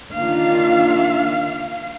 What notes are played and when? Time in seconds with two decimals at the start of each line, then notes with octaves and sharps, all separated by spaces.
0.13 D#3 A#3 D4 F4 F5